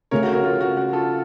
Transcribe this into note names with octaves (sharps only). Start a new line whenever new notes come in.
C#3 A3 C#4 A#4 C#5
F#4 A#4
F#4 A#4
F4
F#4
F#4
F4 A4